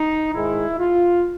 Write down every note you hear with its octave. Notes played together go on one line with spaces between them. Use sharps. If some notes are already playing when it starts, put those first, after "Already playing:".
Already playing: D#4
G#2 D#3 G#3 E4
F4